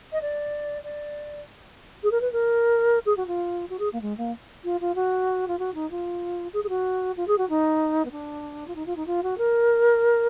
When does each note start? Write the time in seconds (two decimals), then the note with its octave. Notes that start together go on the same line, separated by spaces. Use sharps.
0.12 D#5
0.21 D5
0.84 D5
2.03 G#4
2.11 A#4
2.21 B4
2.32 A#4
3.06 G#4
3.17 F#4
3.27 F4
3.70 F#4
3.79 G#4
3.92 A#3
4.01 G#3
4.17 A#3
4.64 F4
4.80 F4
4.95 F#4
5.47 F4
5.59 F#4
5.74 D#4
5.90 F4
6.53 G#4
6.64 G#4
6.69 F#4
7.17 F4
7.27 G#4
7.38 F#4
7.49 D#4
8.05 B3
8.11 D4
8.67 F4
8.75 D#4
8.86 F4
8.96 D#4
9.06 F4
9.23 F#4
9.38 A#4